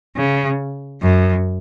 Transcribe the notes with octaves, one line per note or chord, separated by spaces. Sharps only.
C#3
F#2